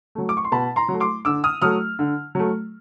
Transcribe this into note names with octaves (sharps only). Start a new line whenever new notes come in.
F#3 A3
D6
C#6
C6
B2 A5 B5
A#5 C6
F#3 A3
C6 D6
D3 D6 E6
D#6 F6
F#3 A3 D#6 F6
D3
F#3 A3